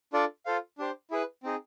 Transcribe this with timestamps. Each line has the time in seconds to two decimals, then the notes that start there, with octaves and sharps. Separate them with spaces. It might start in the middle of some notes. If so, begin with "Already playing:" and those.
0.13 D4 F4 A4 D5
0.46 F4 A4 C5 F5
0.78 D4 G4 C5
1.11 E4 G#4 B4
1.43 C4 D#4 G#4